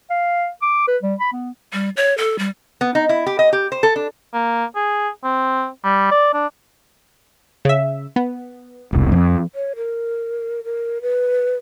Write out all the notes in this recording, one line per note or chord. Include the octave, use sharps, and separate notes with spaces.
F5
D6
B4
G3
B5
B3
G3
C#5
A4
G3
B3
D#4
E4
G4
D#5
G4
C5
A4
D4
A#3
G#4
C4
G3
D5
D4
C#3 E5
B3
E1 C2
F2
C#5
A#4
A#4
B4